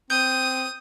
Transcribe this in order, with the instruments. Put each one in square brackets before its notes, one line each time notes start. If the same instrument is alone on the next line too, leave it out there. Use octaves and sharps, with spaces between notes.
[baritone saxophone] C4 [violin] D#6 [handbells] G6